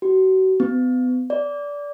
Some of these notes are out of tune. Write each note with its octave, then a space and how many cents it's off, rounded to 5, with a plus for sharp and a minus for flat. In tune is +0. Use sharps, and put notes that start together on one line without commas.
F#4 +35
B3 +35
D5 -20